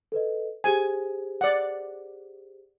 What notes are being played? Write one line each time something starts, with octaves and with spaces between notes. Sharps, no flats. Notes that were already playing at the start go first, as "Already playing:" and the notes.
A4 B4 D#5
G4 G#4 C5 G#5
D5 F#5